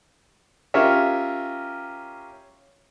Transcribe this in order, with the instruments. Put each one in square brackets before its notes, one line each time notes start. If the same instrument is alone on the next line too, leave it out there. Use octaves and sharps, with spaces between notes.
[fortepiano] C#4 F4 G4 A#4 C#5 E5